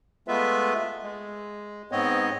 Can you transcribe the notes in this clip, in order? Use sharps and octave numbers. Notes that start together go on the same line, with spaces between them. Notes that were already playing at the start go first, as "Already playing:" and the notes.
G#3 A3 B3 F4 B4 E5
G#3
G#2 B3 C4 C#5 D#5